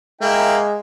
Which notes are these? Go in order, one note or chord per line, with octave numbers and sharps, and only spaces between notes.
G#3 A#3 E4 G5